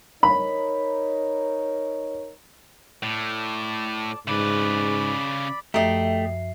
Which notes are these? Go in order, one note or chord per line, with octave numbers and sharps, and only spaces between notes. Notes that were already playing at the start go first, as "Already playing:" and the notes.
D#4 A#4 C#5 B5
A2 D5 A5
G#2 C#3 B4 D5 B5
F#2 F3 A3 G4 D#5 E5 C7